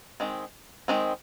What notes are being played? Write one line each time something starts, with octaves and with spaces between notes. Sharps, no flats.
D#3 G#3 C4
D#3 G#3 C4